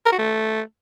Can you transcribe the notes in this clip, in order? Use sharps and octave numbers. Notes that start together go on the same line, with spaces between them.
A#4
F#4
A3